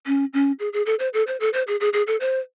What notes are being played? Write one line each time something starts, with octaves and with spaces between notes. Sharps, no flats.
C#4
C#4
G#4
G#4
A4
C5
A4
C5
A4
C5
G#4
G#4
G#4
A4
C5